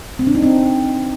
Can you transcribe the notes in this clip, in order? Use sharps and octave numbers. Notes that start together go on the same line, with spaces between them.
C4
D4
D#4
C4